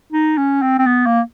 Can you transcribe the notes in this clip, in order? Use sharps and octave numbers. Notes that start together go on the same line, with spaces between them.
D#4
C#4
C4
C4
B3
A#3